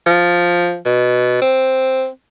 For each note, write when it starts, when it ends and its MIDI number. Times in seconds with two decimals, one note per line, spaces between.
0.06 0.77 53
0.86 1.42 47
1.42 2.07 60